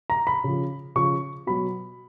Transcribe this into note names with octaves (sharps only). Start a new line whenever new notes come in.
A#5
B5
C#3 F3
C#3 F3 C#6
B2 F#3 B5